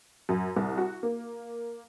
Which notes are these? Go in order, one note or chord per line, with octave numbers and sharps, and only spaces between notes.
F#2
C2
F#4
A#3